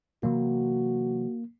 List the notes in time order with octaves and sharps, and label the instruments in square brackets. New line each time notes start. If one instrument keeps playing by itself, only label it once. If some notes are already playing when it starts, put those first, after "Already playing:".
[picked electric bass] C3 E3 F#3 [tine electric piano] A#3 [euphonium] F#4